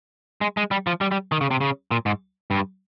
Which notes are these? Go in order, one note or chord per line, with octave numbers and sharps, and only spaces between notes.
G#3
G#3
G3
F3
G3
G3
D#3
C#3
C3
C#3
A#2
G#2
G2